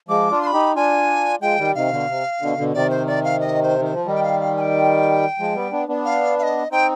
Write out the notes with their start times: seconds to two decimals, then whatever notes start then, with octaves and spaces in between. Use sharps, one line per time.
0.09 F3 G#3 D6
0.31 D4 F4
0.42 C6
0.47 B5
0.53 D#4 G4
0.76 D4 F4 G#5
1.41 F3 G#3 G5
1.58 D#3 G3
1.75 C3 D#3 F5
1.91 B2 D3
2.08 C3
2.40 B2 D3
2.57 B2 D3
2.74 C3 D#3 D5
2.90 C5
3.07 D5
3.24 F5
3.40 D#5
3.63 C5
3.79 D#3
3.85 C5
3.93 F3
4.06 D#3 G3 D#5
4.15 G5
4.23 F5
4.40 F5
4.56 G#5
4.61 G5
5.39 F3 G#3
5.55 G3 B3
5.72 B3 D4
5.88 B3 D4
6.05 F5
6.39 F5
6.43 D#5
6.71 C4 D#4 G5